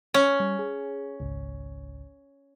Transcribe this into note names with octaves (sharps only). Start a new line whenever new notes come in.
C#4 C#5
G3
G#4
G#1 C#2